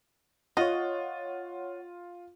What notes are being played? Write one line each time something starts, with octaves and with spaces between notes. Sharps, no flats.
F4 C#5 D#5 F#5